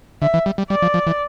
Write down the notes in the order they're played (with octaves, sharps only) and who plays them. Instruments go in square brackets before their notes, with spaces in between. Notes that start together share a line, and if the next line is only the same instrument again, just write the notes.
[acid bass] D3 [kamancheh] E5
[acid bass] E3
G3
G3
[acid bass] G3 [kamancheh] D5
[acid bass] F3
F3
E3